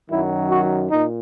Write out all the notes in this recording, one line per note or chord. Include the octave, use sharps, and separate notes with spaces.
F#2 D#3 F#3 E4
F#4
A#2 D#4